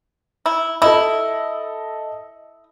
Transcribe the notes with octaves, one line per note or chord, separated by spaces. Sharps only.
E4
E4 A4 D#5